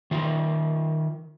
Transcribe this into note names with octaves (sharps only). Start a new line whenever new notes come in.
D#3 F4